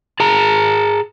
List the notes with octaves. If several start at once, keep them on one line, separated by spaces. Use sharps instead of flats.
G#4 A5 A#5